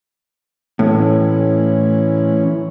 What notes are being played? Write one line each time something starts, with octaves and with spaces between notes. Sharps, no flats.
A2 E3 C#4